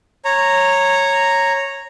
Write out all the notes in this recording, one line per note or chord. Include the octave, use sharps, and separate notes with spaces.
C#5 A#5